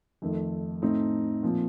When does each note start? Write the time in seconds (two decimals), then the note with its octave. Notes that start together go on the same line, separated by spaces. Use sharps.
0.22 F2 D#3 A3
0.82 A2 A3 C4 D#4
1.43 A#2 F3 C4